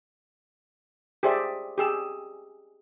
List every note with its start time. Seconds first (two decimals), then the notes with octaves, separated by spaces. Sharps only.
1.23 G4 G#4 C5 D5 E5
1.78 G4 G#4 E6